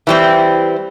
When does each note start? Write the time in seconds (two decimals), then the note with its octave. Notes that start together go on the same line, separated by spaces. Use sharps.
0.07 E3 G3 C4